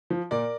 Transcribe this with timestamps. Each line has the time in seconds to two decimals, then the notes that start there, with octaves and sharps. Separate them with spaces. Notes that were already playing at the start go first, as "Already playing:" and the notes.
0.10 F3
0.31 A#2 A#4 D5